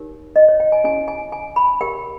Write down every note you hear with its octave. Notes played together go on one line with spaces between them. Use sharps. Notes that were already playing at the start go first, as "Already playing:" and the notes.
Already playing: D#4 G4 A#4 C#5
D#5
C#5
G5
G#5
C#4 E4 G4 G#5
G#5
G#5
B5
G4 A#4 C#5 G5